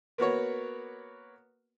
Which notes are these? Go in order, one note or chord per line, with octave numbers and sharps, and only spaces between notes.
A#3 B3 F#4 C#5